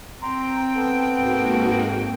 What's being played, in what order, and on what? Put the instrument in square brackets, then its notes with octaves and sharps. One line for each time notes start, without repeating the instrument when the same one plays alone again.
[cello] C4 G5 [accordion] A#5 C6
[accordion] B3 A4
[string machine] G#2 A#3 F#4